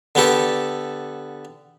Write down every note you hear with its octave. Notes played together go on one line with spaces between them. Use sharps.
D3 B3 G4 A4